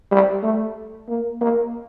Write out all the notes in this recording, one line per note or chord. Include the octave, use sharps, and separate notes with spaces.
G3
A3
A#3
A#3